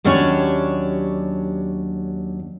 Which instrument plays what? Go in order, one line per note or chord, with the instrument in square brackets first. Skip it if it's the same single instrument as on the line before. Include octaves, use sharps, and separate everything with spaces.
[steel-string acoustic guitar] D#2 F#3 C#4 D4 G4 C#5